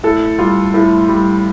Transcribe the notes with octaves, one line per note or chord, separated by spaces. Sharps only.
A2 A4
G3 F4
A2
G3